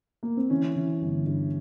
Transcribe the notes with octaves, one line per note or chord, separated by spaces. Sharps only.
A#3
C4
E3 C#4
E3
G1
G2